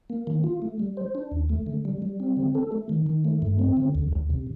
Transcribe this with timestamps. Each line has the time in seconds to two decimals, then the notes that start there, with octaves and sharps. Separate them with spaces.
0.10 A#3
0.27 D#3
0.44 F4
0.62 A3
0.80 G3
0.97 C5
1.15 D4
1.31 D#2
1.49 A3
1.67 D3
1.85 G3
2.02 G3
2.20 C4
2.37 D3
2.55 A4
2.72 A3
2.89 D#3
3.06 D#3
3.25 A3
3.42 G2
3.59 C4
3.77 D3
3.95 D2
4.13 D2
4.30 C3